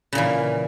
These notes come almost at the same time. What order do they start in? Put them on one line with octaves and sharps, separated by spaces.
C#3 A#2 E3